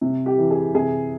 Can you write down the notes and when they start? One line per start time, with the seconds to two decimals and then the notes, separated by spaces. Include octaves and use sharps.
0.01 C3
0.26 G4
0.38 E3
0.51 G#4
0.75 C3 G#4